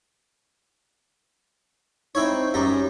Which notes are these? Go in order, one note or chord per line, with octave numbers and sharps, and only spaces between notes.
C4 D#4 E4 C#5
F#2 G3 C#4 A#5